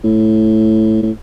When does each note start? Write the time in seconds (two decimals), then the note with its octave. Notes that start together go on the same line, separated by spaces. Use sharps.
0.04 A2
1.02 A2